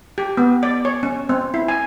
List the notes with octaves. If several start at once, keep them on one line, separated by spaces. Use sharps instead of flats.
G4
B3
D5
C#5
C#4
C4
E4
G#5